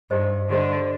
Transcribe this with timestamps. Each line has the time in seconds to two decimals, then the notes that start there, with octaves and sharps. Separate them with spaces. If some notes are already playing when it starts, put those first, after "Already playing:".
0.10 G2 D#4 G4 C5 D#5
0.49 D3 D#4 G4 C5 D#5